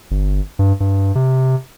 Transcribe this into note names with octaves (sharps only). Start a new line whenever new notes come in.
G1
G2
G2
C3